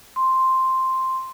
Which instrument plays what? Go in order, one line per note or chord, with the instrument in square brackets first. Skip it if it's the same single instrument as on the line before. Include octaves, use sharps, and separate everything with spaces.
[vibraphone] C6